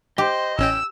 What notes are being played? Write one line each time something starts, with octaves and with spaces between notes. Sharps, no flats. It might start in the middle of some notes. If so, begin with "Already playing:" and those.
G4 C5 D#5
A1 C#4 G5 E6